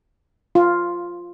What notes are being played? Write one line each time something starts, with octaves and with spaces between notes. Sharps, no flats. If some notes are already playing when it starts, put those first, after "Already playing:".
F4